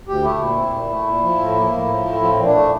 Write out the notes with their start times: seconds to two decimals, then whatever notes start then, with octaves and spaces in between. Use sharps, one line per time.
0.08 D2 G4
0.24 A3 E4
0.40 A#2
0.57 C4
0.74 A#2
0.90 A3
1.07 A#2
1.23 F3
1.40 A2
1.56 A#3
1.72 A2
1.89 F3
2.05 A2
2.21 F3 C4
2.37 A#2
2.46 D4
2.54 A3